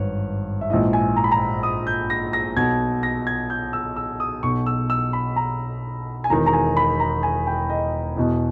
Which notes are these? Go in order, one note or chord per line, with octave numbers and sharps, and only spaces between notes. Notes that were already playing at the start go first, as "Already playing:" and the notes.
Already playing: G#1 G2 B4 C#5
E5
A#1 G#2 E3 D#5
G#5
A#5
B5
A#5
D#6
G6
A#6
A#6
B1 B2 G#6
A#6
G#6
G6
E6
E6
D#6
B1 B2 C#6
E6
E6
B5
A#5
G#5
E1 E2 D#3 A#5
A#5
G#5
B5
A#5
G#5
G5
D#5
E1 E2 B2 D#5